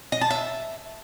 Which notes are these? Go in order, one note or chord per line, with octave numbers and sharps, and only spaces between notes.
D#5
A5
E5